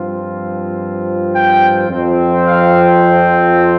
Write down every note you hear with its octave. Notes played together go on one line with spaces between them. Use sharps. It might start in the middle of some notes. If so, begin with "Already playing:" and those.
Already playing: G2 F3 C4 F4
G5
F2 F3 C4
F5